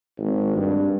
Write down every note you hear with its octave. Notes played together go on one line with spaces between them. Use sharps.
G#1
G2